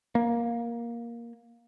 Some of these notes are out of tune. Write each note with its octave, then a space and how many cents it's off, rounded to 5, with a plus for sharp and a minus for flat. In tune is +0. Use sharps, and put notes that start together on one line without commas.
A#3 +10